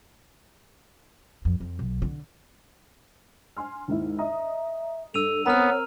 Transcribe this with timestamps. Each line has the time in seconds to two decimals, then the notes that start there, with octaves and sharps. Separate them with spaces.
1.45 F2
1.60 F2
1.79 B1
2.02 D3
3.57 G#5 C6 F6
3.88 D#2 G#2 E4
4.19 D#5 E5 A#5 D#6
5.14 G2 A4 E6 D#7 F7
5.46 B3 C4 A#4 C#5 A#5 F6